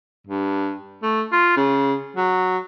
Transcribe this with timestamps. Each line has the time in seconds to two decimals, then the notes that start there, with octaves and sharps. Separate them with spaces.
0.27 G2
1.03 A3
1.32 F4
1.56 C#3
2.17 F#3